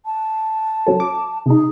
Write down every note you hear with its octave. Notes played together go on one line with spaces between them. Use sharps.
A5
C#3 F#3 A4
D6
C3 D#4 G#4